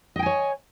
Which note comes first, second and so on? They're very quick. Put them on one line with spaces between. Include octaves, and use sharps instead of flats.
D#5 G5 G#5 C#5